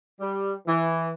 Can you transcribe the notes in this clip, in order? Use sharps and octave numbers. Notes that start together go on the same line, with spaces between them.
G3
E3